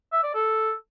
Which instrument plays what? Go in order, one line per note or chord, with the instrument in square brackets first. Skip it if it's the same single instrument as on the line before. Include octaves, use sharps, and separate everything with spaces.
[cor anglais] E5
D5
A4